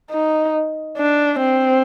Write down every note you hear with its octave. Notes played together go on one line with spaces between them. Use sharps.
D#4
D4
C4